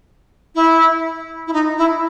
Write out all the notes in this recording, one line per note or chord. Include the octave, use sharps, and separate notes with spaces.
E4
E4
D#4
E4